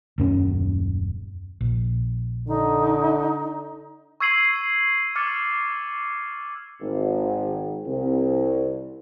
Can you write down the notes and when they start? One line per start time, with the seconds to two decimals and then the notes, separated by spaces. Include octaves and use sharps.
0.18 D#1 F#2 C#4
1.61 A#1
2.48 D3 D#4
4.20 C#6 E6 G#6 C7 D#7 F#7
5.16 D6 F6 A6 C#7
6.81 G#1
7.87 C2